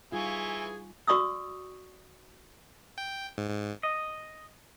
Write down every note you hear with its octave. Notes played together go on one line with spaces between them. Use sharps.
E3 G3 D#4 F4 G#4 G#5 C#6
F#4 D5 C#6 D#6 E6
G5
G#2
G#2
D#5